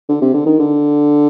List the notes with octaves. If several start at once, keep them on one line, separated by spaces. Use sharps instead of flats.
D3
C3
D3
D#3
D3